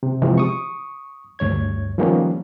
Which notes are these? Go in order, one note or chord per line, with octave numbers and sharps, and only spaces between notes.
C3
C3 E3 F3 G#3
C#6 D#6
D2 G2 C#5 G#6
D#3 F3 G3 A#3 B3 C#4